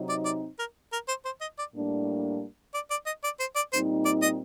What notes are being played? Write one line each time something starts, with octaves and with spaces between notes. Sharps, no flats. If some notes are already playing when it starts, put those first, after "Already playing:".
Already playing: C3 F#3 C4 D#4
D5
D5
A#4
A#4
C5
C5
D#5
D5
A2 G3 A#3 D4
D5
D5
D#5
D5
C5
D5
A#2 G3 C4 D#4 C5
D5
D#5